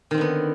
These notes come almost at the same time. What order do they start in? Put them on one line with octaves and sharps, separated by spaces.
D#3 C4 D3 B3